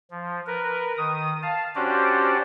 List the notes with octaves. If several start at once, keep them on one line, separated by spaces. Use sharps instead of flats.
F3
A#4 B4
D#3 D#6
F5 A5
C#4 D4 F#4 G4 C5 D5